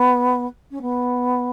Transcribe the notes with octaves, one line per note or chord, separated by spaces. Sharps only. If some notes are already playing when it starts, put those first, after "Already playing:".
Already playing: B3
C#4
B3